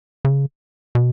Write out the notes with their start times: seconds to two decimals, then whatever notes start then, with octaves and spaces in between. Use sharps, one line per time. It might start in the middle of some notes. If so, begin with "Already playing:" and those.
0.25 C#3
0.95 B2